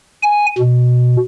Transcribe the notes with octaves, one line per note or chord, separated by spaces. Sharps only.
G#5
B2